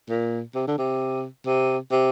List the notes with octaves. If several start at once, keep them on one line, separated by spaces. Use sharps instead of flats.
A#2
C3
D3
C3
C3
C3